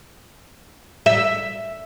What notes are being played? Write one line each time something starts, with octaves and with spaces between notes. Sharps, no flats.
E5